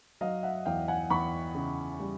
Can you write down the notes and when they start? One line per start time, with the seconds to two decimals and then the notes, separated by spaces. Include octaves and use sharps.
0.21 F#3 D#5 F5
0.43 E5 F#5
0.66 E2 F5 G5
0.88 F#5 G#5
1.10 E2 B5 C#6
1.55 C#3
2.00 G3